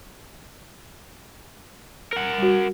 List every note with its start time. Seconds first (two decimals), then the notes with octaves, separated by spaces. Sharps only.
2.13 A#4 F#5
2.38 G3 F#4